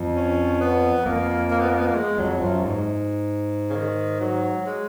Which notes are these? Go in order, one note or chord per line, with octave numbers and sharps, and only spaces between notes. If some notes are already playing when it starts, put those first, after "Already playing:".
Already playing: F2
C#4
B3
F2 A#3
A#3
B3
A#3
B3
A#3
G#3
F2 F#3
F#2 F3
G#2
C#3
D#3
F#3
G#3